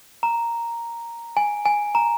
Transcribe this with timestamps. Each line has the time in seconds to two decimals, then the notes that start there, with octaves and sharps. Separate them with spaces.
0.23 A#5
1.37 G#5
1.66 G#5
1.95 A#5